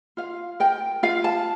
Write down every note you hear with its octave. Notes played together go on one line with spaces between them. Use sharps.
F4 F5
A#4 G5
F4 F5
A5